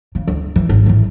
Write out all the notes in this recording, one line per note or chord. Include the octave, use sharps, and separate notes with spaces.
C#3
D2
E3
G#1
A2 E3